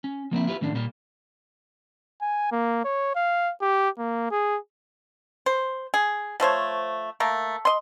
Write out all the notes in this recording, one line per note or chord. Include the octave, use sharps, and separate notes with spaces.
C#4
F3 A#3 C4 E4
E4 F4 G4 B4
A2 D#3 C#4 D4
A#2 G3 A#3 G4
G#5
A#3
C#5
F5
G4
A#3
G#4
C5
G#4
F3 A3 C5 C#5
A3 A#3 A#4
D#5 C6